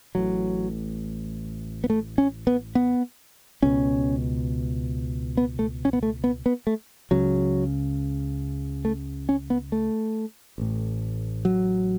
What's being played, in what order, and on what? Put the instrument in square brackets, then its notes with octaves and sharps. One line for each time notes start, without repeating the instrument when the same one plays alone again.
[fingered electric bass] A1 A2 F#3
B3
A3
C#4
B3
B3
C#2 B2 C#4
B3
A3
C#4
B3
A3
B3
B3
A3
C#2 C#3 F#3
A3
C#4
B3
A3
A1 A2
F#3